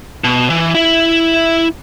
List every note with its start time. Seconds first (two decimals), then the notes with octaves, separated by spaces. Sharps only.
0.24 B2
0.50 E3
0.75 E4 E5